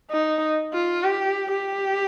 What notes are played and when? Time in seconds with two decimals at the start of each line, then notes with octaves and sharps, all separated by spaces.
0.11 D#4
0.73 F4
1.04 G4
1.52 G4